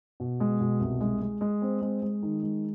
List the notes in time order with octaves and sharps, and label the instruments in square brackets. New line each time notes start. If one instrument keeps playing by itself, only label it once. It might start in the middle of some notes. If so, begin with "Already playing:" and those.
[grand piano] B2
G#3
B2
C2
G#3
G#3
G#3
C4
G#3
G#3
D#3
G#3